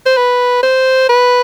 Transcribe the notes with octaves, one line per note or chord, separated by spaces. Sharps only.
C5
B4
C5
B4